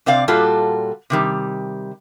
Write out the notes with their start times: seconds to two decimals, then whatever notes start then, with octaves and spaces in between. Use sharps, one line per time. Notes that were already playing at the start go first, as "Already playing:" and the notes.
0.06 C3 C4 D5 F5
0.28 A#2 G3 F4 F#4 A4
1.10 C3 D#3 G3